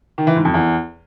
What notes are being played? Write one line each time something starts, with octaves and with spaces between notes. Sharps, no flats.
D#3
E3
G#2
F2
E2